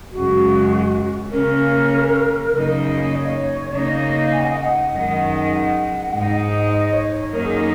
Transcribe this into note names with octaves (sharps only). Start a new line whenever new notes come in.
F#2 C#3 G#3 F#4
C#3 A#3 C#4 A#4
F#2 C#3 A#3 D#4
D#5
C#5
C#3 A#3 D#4
G#5
F#5
D#5
F#5
F#2 D#3 G#3 D#4
F#5
G#2 G#3 D#4
D#5
C#5
C#5
F#2 D#3 F#3 A#3 D#4 A#4
G#4
A#4